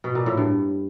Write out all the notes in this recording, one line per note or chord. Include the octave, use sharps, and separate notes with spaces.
B2
A#2
A2
G2